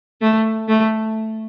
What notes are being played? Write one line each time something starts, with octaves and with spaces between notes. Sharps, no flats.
A3
A3